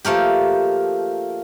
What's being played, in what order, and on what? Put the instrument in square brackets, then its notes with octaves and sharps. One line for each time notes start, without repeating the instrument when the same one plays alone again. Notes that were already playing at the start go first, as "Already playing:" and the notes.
[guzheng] F3 A3 A#3 G4